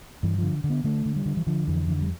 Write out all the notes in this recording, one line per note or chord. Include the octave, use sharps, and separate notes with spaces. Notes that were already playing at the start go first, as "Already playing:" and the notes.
G2 E3
D3 F3
D3
B3
D3 A3
D3
G3
D3
E3
D3 F3
F2 E3
D3 E3
G3